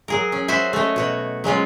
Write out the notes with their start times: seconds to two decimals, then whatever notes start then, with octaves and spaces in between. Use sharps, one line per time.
0.08 F#3 G#4 A#4
0.32 C#4
0.48 F#4 C5 E5 G#5
0.73 A3 C#4 C#5 D#5
0.96 B2 F#4 C#5
1.44 F#3 G#3 C#4 F4